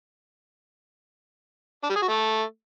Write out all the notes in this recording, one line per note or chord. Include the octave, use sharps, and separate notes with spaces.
D4
G3
G#4
F#4
A3